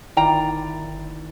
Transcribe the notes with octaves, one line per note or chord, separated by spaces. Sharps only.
G1 D#3 E4 F4 D5 G5 A#5